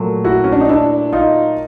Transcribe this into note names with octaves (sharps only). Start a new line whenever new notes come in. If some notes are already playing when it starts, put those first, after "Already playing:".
Already playing: A#2 F#3 A3
E4 F#4
C#4
D4
D#4
D4 E4
D#4 F4